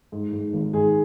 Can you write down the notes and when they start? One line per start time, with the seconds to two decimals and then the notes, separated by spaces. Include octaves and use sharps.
0.12 G#2
0.33 G#2
0.53 G#1
0.73 G#2 G#4